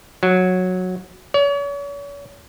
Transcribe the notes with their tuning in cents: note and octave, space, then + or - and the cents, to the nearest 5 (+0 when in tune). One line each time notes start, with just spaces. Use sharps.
F#3 -10
C#5 +40